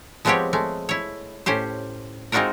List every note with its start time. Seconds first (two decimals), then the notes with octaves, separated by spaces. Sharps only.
0.25 F3 G#3 B3 C4 G4 C#5
0.53 G#3 A3
0.89 E4 C#5
1.46 A2 C#4 G4 C5
2.32 G#3 C4 D#4 F4 F#4 A#4